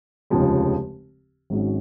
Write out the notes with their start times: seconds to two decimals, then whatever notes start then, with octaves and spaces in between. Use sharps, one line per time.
0.30 F1 D#2 C#3 F3 G#3
1.50 G#1 G#2 F#3 C#4